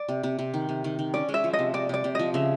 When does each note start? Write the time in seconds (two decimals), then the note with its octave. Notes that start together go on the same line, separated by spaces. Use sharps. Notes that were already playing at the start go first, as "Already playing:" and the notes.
Already playing: D5
0.08 C3
0.23 C3
0.39 C3
0.54 D#3
0.69 C3
0.84 D#3
0.99 D#3
1.14 C#4 D5
1.29 G#3
1.34 E5
1.44 F3
1.53 D#5
1.59 C3
1.74 C3 D5
1.89 C3 D5
2.04 C3
2.15 F3 D#5
2.34 C#3 E5